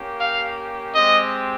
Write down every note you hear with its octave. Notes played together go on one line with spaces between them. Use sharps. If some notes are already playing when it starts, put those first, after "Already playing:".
Already playing: A#3 C#4 G4
F5
G#3 C4 G4 D#5